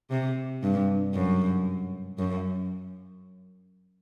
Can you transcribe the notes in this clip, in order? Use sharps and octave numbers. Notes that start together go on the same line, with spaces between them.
C3
G2
F#2
F#2